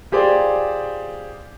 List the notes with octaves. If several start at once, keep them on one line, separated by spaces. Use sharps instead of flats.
F4 G4 G#4 C5 D5